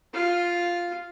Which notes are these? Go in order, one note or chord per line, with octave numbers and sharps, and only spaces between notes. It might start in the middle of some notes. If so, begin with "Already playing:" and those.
F4 F5